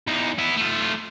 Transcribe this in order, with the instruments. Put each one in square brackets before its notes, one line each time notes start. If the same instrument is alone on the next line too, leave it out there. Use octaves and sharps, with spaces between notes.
[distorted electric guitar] E2 D#4
B3 E4
A3 F4